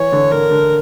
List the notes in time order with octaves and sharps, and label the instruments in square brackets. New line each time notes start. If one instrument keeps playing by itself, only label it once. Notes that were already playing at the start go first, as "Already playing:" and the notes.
Already playing: [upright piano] E3 [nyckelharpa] C#5
[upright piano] D3
[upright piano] D3 [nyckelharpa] A#4
[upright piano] D3